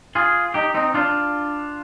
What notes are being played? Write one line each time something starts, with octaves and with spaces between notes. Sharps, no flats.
F4 G#4
D#4 G4
C4 D#4
D4 F4